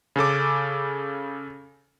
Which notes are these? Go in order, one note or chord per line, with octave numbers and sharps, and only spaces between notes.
C#3 C#4 A4 D6